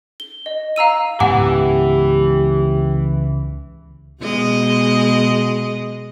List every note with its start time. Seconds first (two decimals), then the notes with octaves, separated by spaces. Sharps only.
0.20 G7
0.46 D#5
0.76 F5 A#5 E6 D#7
1.20 C#2 G#2 E3 B3 G4 F#5 G#5 D6
4.21 B2 G#3 D#5